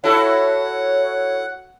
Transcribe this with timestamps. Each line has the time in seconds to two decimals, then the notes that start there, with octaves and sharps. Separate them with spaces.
0.04 E4 F#4 A4 C#5 F#5